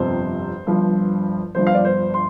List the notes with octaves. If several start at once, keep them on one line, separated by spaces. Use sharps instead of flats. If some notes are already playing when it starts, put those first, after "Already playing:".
Already playing: G1 F2 C3 C5
G1 G2 F3
G1 G2 F3 C5
F5
D5
C5
C6